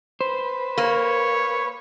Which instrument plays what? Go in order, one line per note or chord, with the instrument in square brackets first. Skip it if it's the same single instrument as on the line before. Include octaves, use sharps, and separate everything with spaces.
[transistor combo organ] B4 [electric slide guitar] C5
[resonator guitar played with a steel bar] A#3 [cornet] C#5